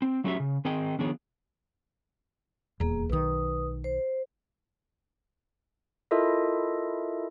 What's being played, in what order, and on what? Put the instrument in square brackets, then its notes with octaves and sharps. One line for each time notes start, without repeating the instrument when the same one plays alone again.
[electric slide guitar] C4
F#3 A3 C#4 F#4 G4 E5
C#3
D#3 C4 G#4 D#5 G5
D#3 F3 B3 D4 G#4 C#5
[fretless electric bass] D#1 E2 [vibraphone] A#3 G#4
[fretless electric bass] B1 D#3 [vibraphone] B4 D#6
[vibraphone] C5
[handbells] E4 F4 A4 A#4 D#5 E5